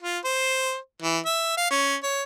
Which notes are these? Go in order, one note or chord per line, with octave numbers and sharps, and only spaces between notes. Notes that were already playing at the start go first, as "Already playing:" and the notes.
F4
C5
E3
E5
F5
C#4
C#5